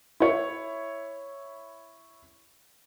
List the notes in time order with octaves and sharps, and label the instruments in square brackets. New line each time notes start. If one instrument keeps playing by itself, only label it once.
[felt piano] E4 C#5